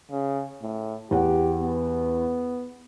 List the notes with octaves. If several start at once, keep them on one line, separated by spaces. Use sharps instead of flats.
C#3
A2
E2 G4 F#5
B3